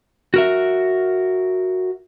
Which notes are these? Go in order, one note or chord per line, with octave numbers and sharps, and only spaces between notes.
F#4 A#4 E5